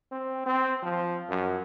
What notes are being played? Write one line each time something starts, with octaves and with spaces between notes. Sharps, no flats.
C4
C4
F3
F#2